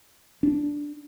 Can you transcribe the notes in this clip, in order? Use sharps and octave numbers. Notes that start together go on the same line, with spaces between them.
D4